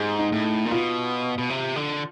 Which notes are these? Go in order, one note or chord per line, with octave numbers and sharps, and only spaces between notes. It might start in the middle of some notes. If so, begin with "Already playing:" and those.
Already playing: G#2 G4 G#4
D#4
A2
A#2
B2 F4
B2
C3
D3